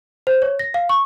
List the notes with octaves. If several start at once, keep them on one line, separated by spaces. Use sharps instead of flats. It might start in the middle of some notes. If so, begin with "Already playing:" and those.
C5
C#5
A#6
F5
C#6